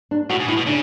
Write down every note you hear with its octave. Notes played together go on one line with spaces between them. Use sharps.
D4
A2 F#4
G#2
A2 E4
B2
C#3 D4